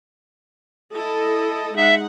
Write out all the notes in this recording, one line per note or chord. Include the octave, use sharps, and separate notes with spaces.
E4 A4 D#5
G#3 D#4 E5 F#5